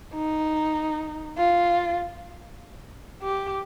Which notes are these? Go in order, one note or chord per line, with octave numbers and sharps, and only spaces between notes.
D#4
F4
G4